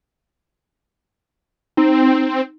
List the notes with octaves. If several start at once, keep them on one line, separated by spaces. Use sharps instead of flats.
C4 D#4